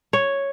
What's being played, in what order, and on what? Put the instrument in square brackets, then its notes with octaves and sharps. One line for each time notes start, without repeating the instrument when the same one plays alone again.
[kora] C#5